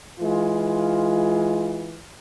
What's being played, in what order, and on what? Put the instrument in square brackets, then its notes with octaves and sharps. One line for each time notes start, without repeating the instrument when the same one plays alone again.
[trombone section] E3 G#3 F4